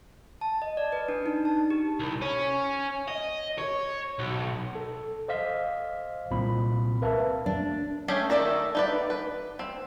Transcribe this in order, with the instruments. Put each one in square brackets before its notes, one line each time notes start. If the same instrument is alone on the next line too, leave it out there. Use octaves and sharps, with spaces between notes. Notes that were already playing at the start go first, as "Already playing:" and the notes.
[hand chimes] A5
D#5
D5
B4
D4
D#4
A5
G4
[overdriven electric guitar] C2
C#4
D#5
C#5
B1
[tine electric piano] A4
C5 D#5 F5 B6
C2 A#2 C4 B5
A#4 B4 E5 F5 A5
[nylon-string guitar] D4
[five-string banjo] A3 C#4 G4 G#4
D#3 A3 D5 E5 A#5
D#4 B4 D5
B4
C4